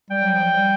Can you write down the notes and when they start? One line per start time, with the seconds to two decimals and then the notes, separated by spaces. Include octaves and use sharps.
0.10 G3 G5
0.22 F#3
0.34 F3
0.44 G3